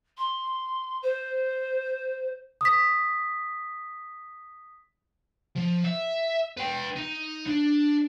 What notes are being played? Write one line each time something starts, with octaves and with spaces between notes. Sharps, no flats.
C6
C5
D#6 B6
F3
E5
B4 G5
D#4
D4